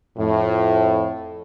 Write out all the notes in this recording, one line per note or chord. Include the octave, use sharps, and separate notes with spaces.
F2 A2